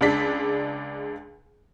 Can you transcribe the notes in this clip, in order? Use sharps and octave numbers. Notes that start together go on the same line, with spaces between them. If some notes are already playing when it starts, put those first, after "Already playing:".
C#2 G#3 D4 B6